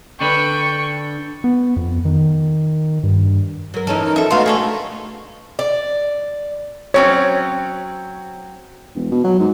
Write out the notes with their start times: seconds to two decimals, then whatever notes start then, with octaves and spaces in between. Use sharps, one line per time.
0.21 D3 D4 B4 G5 C#6
1.44 B3
1.76 F2
2.05 D#3
3.03 G2
3.74 F#3 A#4
3.87 A2 E3 C#4 D#4 A4 A#4
4.04 A#4
4.16 F3 A4 E5
4.31 A3 B3 D#4 F#4 F5 C6
4.46 C3 D4 G#4 A4 C#5
5.59 D5
6.94 F#3 C4 C#4 C#5
8.96 E1
9.12 B2
9.24 F#3
9.40 G#2